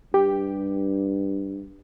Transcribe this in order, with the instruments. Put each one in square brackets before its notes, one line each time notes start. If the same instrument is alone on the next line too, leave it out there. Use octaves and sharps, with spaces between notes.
[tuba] G2 [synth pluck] G4